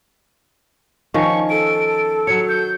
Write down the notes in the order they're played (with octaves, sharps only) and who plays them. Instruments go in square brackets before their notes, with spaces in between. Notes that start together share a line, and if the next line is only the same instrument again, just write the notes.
[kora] D#3 F3 C#4 [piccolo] C#6
[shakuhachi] A4 [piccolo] D7
[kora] F#3 C#5 [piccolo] C#7
[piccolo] G6